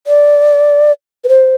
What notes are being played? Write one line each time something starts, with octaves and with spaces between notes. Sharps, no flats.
D5
B4
C5